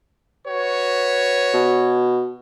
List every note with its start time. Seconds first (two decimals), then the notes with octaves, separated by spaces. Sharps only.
0.47 F#4 B4 C#5
1.54 B2